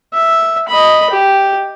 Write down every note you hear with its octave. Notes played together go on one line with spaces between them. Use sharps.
E5
D#5 B5
G4